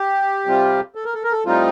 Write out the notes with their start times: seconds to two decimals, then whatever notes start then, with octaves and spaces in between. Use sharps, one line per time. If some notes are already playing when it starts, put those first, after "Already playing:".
Already playing: G4
0.46 C3 G3 C4 F4
0.95 A4
1.05 A#4
1.14 A4
1.23 A#4
1.32 A4
1.46 A2 G3 C4 D#4 F4